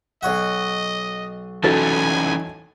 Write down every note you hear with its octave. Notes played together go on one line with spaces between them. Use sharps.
B1 C#5 D#5 F#5
E3 F#3 C#4 D#4 A4 G#5 A6